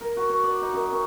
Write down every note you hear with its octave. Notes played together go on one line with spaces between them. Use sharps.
A#4
F#4
C#5
D5
D#4
F#2
C#4